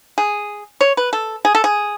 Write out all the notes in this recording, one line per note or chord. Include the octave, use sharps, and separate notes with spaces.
G#4
C#5
B4
A4
G#4
A4
G#4